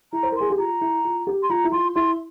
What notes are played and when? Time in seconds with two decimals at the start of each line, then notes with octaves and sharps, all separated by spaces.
0.13 E4 A#5
0.23 C5
0.32 A#4
0.36 G#4 C6
0.50 G4
0.58 F4 A#5
0.81 E4
1.05 F4
1.27 G4
1.43 C6
1.50 F4 A#5
1.64 E4
1.72 F4 C6
1.95 E4 C6